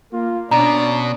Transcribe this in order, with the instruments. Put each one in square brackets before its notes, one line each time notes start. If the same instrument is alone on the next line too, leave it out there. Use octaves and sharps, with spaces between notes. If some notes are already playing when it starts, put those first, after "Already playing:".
[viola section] A#3 [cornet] F4
[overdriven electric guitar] B2 [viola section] C#4 D4 [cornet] D5 [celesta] A#5